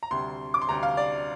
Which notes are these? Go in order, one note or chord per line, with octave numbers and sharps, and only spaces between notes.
A#5
D2 C3 G3 C6
D6
C6
D2 C3 G3 A#5
F5
D5